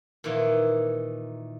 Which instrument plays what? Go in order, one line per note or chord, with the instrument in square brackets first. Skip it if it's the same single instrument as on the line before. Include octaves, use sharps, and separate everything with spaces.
[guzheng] A#2 D#3 E3